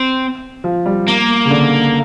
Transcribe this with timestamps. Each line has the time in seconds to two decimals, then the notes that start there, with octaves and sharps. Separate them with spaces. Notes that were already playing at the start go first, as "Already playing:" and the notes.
Already playing: C4
0.64 F3
0.86 G3
1.08 A#3
1.45 C#3
1.50 D3